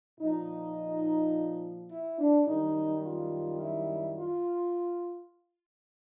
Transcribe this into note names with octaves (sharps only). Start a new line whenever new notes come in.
A#2 F3 D#4
E4
D4
F#2 D#3 G3 D#4
F4
E4
F4